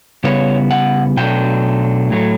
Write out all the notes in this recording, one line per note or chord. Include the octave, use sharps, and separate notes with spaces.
C#3 G3 B3 E4 C#5
F#5
B2 F#3 A3 D4 G5
A2 F#3 A3